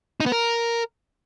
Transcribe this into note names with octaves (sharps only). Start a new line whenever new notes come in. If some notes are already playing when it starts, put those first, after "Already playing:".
D#4
B3
A#4